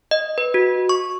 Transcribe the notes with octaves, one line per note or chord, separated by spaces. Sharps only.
D#5
B4
F#4
C#6